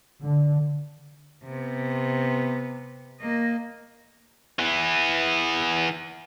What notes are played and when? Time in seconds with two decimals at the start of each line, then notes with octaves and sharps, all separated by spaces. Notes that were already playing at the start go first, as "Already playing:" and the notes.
0.22 D3
1.45 C3 B3
3.21 A#3 D#5
4.59 E3 B3